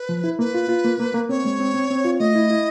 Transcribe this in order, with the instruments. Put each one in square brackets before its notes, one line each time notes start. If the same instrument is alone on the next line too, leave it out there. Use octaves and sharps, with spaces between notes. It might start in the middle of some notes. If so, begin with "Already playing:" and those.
Already playing: [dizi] B4
[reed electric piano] F3
E4
[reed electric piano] A#3 [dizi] B4
[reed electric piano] F4
F4
A#3
A#3
A#3
[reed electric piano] C4 [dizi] C#5
[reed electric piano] G#3
C4
C4
C4
F4
[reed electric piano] A3 [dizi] D#5
[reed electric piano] E4
E4